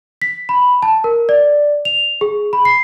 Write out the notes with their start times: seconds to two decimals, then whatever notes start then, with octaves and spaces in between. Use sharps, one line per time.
0.22 B6
0.49 B5
0.83 A5
1.04 A#4
1.29 D5
1.85 F7
2.21 G#4
2.53 B5
2.65 C7